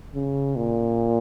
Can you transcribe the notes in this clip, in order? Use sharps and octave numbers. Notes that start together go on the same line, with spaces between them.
C#3
A#2